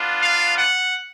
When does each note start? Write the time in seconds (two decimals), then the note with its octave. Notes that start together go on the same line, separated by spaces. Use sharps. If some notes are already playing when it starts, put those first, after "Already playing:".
Already playing: B3 D4 F4
0.22 F5
0.58 F#5